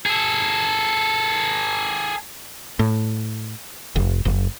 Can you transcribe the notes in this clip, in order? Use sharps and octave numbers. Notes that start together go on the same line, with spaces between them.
G#4 A4
A2
F1
F#1